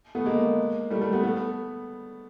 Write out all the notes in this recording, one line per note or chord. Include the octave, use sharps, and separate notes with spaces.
A3 B3
G#3 A#3
G3 A3
G3 A3
A3 B3
A3 B3